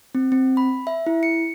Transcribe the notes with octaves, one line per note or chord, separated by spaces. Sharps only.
C4
C4
B5
E5
E4
C#7